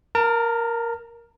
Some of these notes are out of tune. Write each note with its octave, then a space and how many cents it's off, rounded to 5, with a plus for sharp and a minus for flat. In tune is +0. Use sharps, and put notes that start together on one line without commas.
A#4 +5 A5 +45